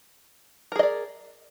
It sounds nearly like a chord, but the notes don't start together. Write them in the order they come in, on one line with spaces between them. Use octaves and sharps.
A#4 G#4 D#5 D5